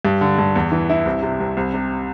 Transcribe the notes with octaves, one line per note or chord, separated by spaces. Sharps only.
G2
D3
G2
E2
E3
E4
C2
C3
C2
C2
C3